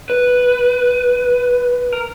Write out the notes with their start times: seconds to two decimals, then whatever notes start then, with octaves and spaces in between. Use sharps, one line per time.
0.10 B4
1.92 A#4